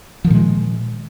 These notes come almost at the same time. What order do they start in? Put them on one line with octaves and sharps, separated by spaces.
F3 D#3 A#2 G#3